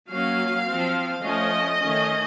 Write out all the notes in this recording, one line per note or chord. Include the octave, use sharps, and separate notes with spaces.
F#3 A#3 C#4 F5
F3 C4
F3 A3 C#4 D#5
D#3 A3 C#4